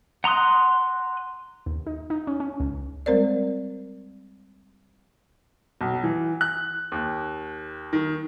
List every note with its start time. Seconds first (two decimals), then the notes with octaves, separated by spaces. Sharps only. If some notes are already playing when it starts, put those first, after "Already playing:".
0.24 F#5 A#5 C6 D#6 F#6
1.66 D#2
1.87 D#4
2.10 D#4
2.27 C#4
2.40 C#4
2.60 C#2
3.06 G3 G#3 C4 A#4 C5 D5
5.81 B1
6.04 E3
6.41 F#6
6.92 D#2
7.93 D#3